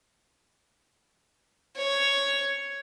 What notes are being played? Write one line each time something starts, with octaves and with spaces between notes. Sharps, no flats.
C#5